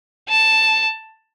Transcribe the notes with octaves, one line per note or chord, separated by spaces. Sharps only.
A5